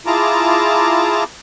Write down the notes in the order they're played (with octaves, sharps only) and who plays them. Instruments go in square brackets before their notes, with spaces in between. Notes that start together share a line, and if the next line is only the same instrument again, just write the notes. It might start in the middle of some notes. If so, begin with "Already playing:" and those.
[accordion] E4 F4 G#4 A5 A#5 D6